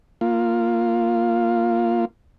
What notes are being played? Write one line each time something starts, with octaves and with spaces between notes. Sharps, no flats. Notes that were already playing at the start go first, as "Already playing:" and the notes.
A#3 F4